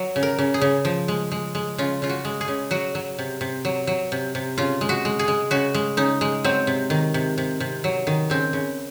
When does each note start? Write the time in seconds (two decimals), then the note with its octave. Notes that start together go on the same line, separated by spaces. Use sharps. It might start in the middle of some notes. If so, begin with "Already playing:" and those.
Already playing: F#3
0.16 C#3
0.23 A#4
0.39 C#3
0.54 G#4
0.61 C#3
0.85 F3
1.08 G#3
1.32 G#3
1.55 G#3
1.78 C#3 F4
2.02 C#3 F4
2.09 F#4
2.25 G#3
2.41 G#4
2.48 C#3
2.71 F#3 F#4
2.95 F#3
3.19 C3
3.41 C3
3.65 F#3
3.87 F#3
4.12 C3
4.35 C3
4.58 C#3 F4
4.81 G#3
4.89 F#4
5.05 G#3
5.19 G#4
5.28 G#3
5.51 C#3 F#4
5.74 G#3
5.97 C#3 D#4
6.21 G#3
6.44 F#3 C4
6.67 C3
6.90 D#3
7.14 C3
7.38 C3
7.60 C3
7.84 F#3
8.07 D#3
8.30 C#3 C4
8.53 C#3